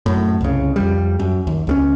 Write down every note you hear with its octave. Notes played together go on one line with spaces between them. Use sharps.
F#2 A2
C2 C#3
F2 G3
F#2
D#2
C#2 G3 C#4